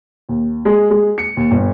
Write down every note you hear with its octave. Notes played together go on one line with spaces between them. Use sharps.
D#2
G#3
G#3
C#7
D#2
G1